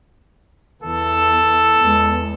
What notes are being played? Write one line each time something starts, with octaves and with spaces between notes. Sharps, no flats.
E2 E3 A4
E2 G#3